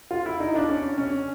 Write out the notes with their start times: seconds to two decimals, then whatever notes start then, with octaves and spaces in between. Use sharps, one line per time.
0.11 F4
0.26 E4
0.40 D#4
0.55 D4
0.69 C#4
0.98 C#4